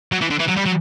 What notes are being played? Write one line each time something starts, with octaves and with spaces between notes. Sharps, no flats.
F#3
E3
D3
E3
F#3
G3
F#3